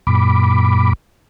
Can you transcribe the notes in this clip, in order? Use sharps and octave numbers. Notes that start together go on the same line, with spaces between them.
F#2 A#2 B5 D6